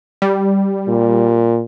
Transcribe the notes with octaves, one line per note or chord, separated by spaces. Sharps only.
G3
A#2